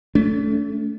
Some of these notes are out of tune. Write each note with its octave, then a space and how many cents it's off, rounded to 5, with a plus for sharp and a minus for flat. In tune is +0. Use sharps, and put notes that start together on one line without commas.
A3 +0 C#4 +45